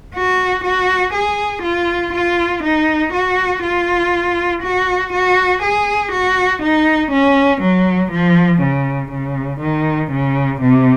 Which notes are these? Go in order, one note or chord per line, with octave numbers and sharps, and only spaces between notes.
F#4
F#4
G#4
F4
F4
D#4
F#4
F4
F#4
F#4
G#4
F#4
D#4
C#4
F#3
F3
C#3
C#3
D#3
C#3
C3